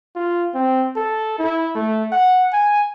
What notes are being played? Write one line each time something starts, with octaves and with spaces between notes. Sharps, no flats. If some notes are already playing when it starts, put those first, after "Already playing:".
F4
C4
A4
E4
A3
F#5
G#5